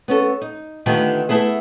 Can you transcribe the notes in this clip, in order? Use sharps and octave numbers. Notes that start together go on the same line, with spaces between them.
B3 C#4 A4
D#4
D3 D#3 A3 B3 F4 G4
A3 B3 E4 G#4